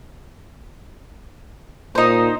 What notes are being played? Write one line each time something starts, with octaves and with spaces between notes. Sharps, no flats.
A#2 D#4 C5